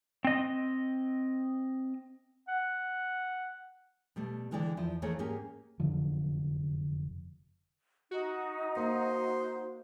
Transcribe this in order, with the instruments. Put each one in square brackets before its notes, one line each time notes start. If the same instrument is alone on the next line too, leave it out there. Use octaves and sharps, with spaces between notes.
[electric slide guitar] C4 D#5
[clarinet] F#5
[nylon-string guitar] B2 G3 A3
D2 D3 E3 G#3 D5 G5
E2 F3 E4
E3 A3 A#3 D#4 G#4 C#5
G#2 A#3 C#4 G4 G#4
[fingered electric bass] F1 F#2 D3 F3
[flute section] D#4 [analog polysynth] F#4
[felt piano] A#3 [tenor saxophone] C5